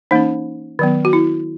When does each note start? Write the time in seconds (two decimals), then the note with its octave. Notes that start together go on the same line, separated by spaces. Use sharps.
0.11 E3 A#3 C#4 D#4
0.79 D#3 F#3 B3
1.05 F#4
1.13 E4